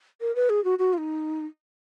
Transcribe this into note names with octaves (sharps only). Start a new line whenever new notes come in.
A#4
B4
G#4
F#4
F#4
F4
D#4